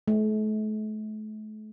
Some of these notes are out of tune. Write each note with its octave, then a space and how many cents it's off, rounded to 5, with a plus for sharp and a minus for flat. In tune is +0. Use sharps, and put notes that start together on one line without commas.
A3 -40